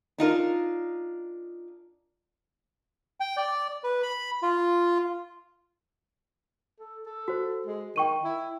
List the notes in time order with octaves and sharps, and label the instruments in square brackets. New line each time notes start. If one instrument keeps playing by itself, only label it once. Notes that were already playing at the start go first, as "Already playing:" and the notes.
[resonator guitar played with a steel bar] D4 D#4 F4 A#4
[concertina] G5
D5
B4
B5
F4
[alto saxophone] A4
A4
[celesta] F#4 C5
[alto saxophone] G#3
[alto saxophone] D#3 [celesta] G5 C#6 D#7
[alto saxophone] E4